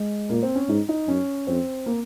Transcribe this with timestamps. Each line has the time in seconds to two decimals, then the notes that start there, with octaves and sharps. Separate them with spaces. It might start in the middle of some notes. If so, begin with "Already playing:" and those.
Already playing: G#3
0.29 A#2 A#3
0.43 C4
0.55 C#4
0.69 G#2 D#4
0.89 D#4
1.08 F#2 C#4
1.47 F2 C4
1.86 A#3